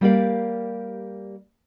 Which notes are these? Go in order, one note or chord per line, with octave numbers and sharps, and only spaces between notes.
G3 A#3 G4 A#4 D5 F5